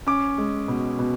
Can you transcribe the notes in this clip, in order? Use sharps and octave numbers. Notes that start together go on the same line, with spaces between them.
C#4 D6
G#3
B2
B2